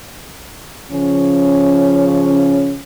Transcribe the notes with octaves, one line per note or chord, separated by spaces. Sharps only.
C#3 F3 C#4